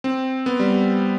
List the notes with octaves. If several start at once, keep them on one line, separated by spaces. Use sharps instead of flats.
C4
B3
G3